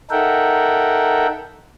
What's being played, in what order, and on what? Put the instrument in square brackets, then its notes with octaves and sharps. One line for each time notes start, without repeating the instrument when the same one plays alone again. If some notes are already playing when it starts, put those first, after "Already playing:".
[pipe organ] D#4 A4 A#4 E5 F#5 G5